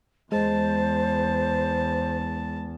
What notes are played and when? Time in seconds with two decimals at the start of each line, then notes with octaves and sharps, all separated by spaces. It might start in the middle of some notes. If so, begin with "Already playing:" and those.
0.32 E2 G#3 C5 A5